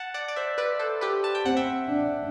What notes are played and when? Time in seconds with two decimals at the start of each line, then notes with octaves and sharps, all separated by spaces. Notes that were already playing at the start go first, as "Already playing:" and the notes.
Already playing: F#5 A5
0.14 D5 F#5
0.28 D5
0.36 C5 E5
0.58 B4 D5
0.79 A4 C5
1.01 G4 B4
1.24 A5
1.35 G5
1.45 C4 F#5
1.57 E5 G5
1.89 D4